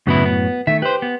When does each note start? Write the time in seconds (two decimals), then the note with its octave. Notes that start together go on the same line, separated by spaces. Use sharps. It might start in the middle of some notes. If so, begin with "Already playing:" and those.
0.07 F#2 A2 C#3 F#3 B3 E4
0.25 B3
0.67 D#3 A3 E5
0.82 G4 B4 C5
1.02 B3